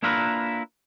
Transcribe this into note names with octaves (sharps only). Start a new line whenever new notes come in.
A#3 D4 E4 F4 A#4 B4